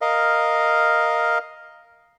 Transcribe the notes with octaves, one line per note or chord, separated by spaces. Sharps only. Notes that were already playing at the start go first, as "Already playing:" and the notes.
A#4 D#5 F5